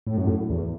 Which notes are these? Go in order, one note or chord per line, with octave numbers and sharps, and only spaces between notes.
A2
F#2
A2
E2